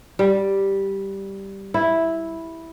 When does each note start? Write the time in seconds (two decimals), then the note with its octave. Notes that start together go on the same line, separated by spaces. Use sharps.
0.19 G3
1.74 E4